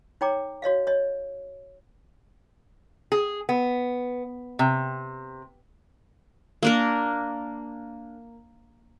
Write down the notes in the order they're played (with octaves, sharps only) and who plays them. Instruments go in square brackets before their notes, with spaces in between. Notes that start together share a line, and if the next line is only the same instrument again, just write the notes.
[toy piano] D#4 C#5 G5 A#5 D6
F#4 C#5 D#5 F5
C#5 D#5
[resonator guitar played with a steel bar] G#4
B3
C3
[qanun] A#3 D4 A#4